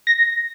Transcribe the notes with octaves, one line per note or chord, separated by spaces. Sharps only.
A#6